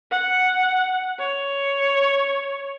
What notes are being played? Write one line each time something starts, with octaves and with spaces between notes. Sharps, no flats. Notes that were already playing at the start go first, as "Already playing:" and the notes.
F#5
C#5